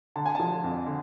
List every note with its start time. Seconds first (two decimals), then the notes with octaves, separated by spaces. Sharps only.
0.16 D3 A5
0.26 G#5
0.35 F3 A5
0.64 F2
0.86 D3